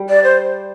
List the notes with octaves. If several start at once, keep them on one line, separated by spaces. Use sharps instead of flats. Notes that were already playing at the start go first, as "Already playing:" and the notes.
Already playing: G3
D5
C5